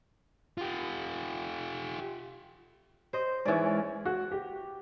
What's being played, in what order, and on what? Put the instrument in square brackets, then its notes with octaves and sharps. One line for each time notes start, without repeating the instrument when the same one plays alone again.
[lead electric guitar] F4 G4
[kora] C5 D#5
[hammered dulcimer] G#2 C#4 [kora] E3 D5
[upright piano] F#4
G4